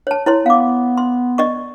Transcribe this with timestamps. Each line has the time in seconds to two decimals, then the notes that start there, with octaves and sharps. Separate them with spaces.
0.07 C#5 A5
0.26 E4 C#5 C6
0.46 B3 F5 D6
0.98 C6
1.38 D5 D#5 C#6